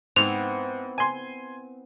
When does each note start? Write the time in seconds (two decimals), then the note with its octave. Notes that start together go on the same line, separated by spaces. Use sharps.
0.16 G#2 B3 C4 E4 F7
0.98 G#5 C6